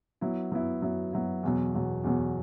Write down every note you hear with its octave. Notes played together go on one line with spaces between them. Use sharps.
F#3 B3 E4
F#3 B3 E4
F#3 B3 E4
F#3 B3 E4
E2 B2 F#3
E2 B2 F#3
E2 B2 F#3